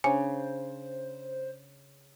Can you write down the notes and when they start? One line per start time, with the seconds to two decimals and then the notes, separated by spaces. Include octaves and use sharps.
0.04 C#3 C#4 D4 C5 G#5